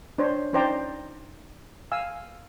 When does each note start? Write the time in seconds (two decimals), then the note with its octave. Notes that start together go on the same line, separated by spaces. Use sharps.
0.18 D4 C5 C#5
0.53 C#4 D#4 C5 D5 G5 A#5
1.92 F5 G#5 E6